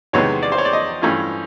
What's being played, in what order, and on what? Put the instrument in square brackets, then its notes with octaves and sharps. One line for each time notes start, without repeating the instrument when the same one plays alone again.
[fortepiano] E2 C3 D#3 G#3 B3 C#5
D5
C5
C#5
D5
D#5
G2 E3 A3 C#4 F4